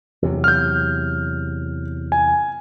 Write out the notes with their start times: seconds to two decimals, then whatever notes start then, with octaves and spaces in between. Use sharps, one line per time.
0.22 E2 C3 F#3
0.44 F6 G6
2.12 G#5